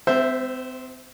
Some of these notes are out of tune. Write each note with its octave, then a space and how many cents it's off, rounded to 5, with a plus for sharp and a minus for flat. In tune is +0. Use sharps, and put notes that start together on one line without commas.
C4 -40 C5 +0 E5 +0